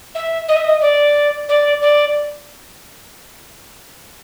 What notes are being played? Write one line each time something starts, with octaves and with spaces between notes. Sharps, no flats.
E5
D#5
E5
D#5
D5
D5
D5